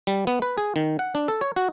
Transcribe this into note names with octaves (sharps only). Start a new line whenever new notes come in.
G3
B3
B4
G#4
D#3
F#5
D4
A4
C#5
F#4